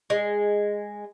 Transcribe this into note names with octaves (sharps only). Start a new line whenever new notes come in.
G#3